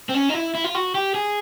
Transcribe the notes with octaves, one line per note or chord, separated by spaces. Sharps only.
C4
C#4
D#4
E4
E4
F4
F#4
G4
G#4